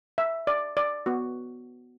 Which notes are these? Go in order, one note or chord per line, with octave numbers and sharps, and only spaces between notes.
E5
D5
D5
B3 F#4